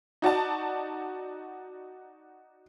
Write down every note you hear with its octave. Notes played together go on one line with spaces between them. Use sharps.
D#4 F#4 D5 A5